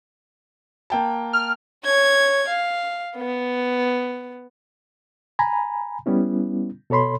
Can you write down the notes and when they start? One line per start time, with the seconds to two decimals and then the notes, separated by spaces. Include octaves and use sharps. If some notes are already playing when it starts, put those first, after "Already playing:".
0.90 A#3 G5 A5
1.33 F6
1.85 C#5 G#6
2.48 F5
3.16 B3
5.39 G#5 A#5 B5
6.06 G3 B3 C#4 E4
6.90 B2 A4 C#5 B5 C6